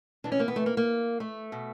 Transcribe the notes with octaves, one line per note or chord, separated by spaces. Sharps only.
C3 E3 D4
C#4
A#3
B3
A3
A#3
A#3
A3
B2